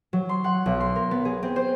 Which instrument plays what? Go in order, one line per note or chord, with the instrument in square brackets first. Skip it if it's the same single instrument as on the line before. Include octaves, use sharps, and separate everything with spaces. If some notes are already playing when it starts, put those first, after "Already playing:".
[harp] F#3
C6
F#5
B1
C6
A#4
B3
G#4
C4
C5